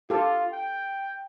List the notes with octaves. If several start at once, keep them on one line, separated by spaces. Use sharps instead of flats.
F4 G4 A4
G5